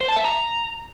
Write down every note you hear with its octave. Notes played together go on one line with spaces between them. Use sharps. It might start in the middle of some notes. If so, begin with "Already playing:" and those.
C5
A5
E5
A#5